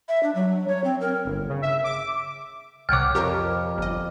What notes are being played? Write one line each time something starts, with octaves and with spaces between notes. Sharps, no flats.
E5
D4
F#3
C#5
C4
A#4
G1
C#3
E5
D6
C2 C3 C#5 F#5 G5 D6 F6
F2 G4 A#4 C#5
G1 D#5